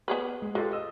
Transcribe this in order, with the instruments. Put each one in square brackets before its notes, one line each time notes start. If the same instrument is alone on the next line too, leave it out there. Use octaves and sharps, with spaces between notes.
[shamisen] B3 G#4 B4
[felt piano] G#3
[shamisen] G#3 [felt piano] F4 G4 A4
[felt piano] D#5 E6